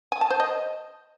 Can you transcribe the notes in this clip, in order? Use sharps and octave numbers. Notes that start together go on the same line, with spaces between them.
G#5
A5
C5
D#5